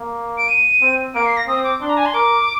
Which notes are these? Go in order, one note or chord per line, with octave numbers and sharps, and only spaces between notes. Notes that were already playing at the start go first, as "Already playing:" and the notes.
Already playing: A#3
D7
D#7
C4
A#3 D7
C7
A#6
C4 D#6
D6
D4 C6
A#5
G#5
C6
A#4 D6